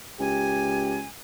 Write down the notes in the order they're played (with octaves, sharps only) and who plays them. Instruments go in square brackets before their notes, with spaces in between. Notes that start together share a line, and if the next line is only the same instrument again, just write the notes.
[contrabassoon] C#2 [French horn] G4 [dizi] G#5